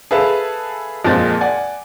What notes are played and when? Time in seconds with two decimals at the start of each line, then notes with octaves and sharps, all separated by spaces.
0.11 G#4 A4 B4 E5 F5 A5
1.05 F2 A#2 G#3 C4 C5 A6
1.41 D5 F#5 G#5